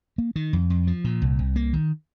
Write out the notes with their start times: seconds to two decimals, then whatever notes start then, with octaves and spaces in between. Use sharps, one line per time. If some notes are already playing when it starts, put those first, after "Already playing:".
0.18 A#3
0.36 D#3
0.53 F2
0.70 F2
0.87 F3
1.04 A#2
1.22 C2
1.39 C2
1.56 A#3
1.73 D#3